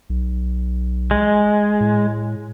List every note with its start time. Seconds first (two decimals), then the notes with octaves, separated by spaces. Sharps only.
0.10 B1
1.11 G#3
1.81 A2